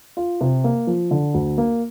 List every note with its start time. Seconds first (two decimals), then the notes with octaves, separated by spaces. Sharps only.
0.17 F4
0.41 C3
0.64 A#3
0.87 F3
1.11 D3
1.34 D2
1.58 A#3